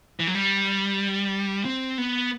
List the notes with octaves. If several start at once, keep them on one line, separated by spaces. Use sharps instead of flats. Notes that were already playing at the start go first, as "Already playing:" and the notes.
E3
F#3
G3
C4
B3